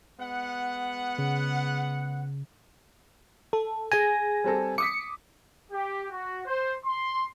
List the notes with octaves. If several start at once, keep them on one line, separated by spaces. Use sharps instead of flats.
G#3 B3 F#5
C#3
A4
G#4 G#5 A#6
G3 C4 A4
D6 D#6 B6 C#7
G4
F#4
C5
C6